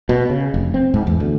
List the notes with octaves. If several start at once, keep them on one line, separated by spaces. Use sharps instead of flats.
B2
C#3
F1
C4
G#2
E2
D2